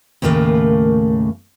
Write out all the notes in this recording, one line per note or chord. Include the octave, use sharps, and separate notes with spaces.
D#2 A2 C#3 A3 A#3